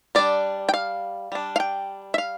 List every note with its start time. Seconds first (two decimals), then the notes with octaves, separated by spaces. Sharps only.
0.15 G3 D4 D5
0.69 G5
0.74 F5
1.32 G3 D4
1.56 F5
1.60 G5
2.14 E5
2.18 F5